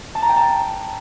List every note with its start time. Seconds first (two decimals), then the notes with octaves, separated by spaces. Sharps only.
0.15 A5
0.22 A#5
0.29 G5
0.36 A5